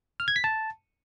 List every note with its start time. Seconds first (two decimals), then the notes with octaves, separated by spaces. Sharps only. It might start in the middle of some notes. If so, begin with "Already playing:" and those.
0.20 F6
0.28 G#6
0.36 B6
0.44 A5